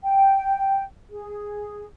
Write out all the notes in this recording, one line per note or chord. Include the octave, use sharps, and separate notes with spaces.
G5
G#4